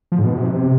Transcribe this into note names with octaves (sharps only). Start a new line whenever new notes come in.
F3
G#2
B2
C3